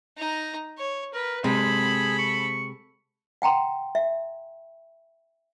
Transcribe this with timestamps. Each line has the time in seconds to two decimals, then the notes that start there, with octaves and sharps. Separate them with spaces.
0.17 D#4 A#5
0.78 C#5
1.14 A#4 B4
1.44 C3 G#3 C4 G#4 A4 B5
2.18 C#6
3.42 F#5 G5 A#5 C6
3.95 E5